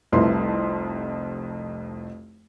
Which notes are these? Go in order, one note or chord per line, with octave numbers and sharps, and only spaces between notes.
F1 C2 F2 E4 B4 C6